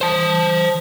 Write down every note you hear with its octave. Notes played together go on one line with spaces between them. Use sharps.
C5 A5